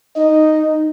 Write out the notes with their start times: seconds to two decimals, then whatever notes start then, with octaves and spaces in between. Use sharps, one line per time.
0.16 D#4 D#5